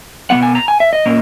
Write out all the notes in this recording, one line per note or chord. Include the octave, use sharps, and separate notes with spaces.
B2 G#3 B3 F#5
G#5
A#5
G#5
E5
D#5
A#2 A#3 C#4